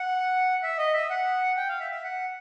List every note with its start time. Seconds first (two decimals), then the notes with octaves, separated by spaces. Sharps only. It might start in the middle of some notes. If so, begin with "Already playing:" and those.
Already playing: F#5
0.63 E5
0.78 D#5
0.93 E5
1.10 F#5
1.57 G5
1.69 F5
1.80 E5
1.91 E5
2.04 F#5